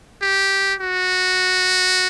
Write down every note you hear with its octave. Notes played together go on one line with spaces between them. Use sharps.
G4
F#4